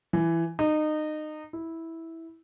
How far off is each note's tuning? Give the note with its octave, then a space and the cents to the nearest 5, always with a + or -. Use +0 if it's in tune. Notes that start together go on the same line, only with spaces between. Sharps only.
E3 +15
D#4 -25
E4 -10